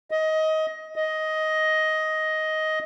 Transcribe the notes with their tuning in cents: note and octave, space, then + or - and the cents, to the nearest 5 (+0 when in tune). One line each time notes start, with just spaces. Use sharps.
D#5 +20
D#5 +10